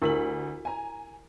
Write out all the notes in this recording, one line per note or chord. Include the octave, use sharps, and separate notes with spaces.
D2 E4 G4 A#4 B6 F#7
G#5 A#5